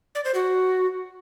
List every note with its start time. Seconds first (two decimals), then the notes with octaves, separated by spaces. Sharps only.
0.15 D5
0.25 C5
0.35 F#4